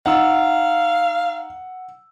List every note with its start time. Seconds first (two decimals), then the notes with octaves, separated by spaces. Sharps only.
0.06 D#4 F5 F#5 E6